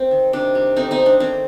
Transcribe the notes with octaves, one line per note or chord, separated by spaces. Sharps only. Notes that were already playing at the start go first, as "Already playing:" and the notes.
Already playing: C4
D#3
C3 D4
G3
A3 C4 D#4
C4 D#4
A3
D4
D#3 C4